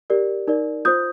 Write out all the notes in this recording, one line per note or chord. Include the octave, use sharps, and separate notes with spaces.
G4 A#4 D5
D#4 A#4 D5
F4 C5 D#6 G6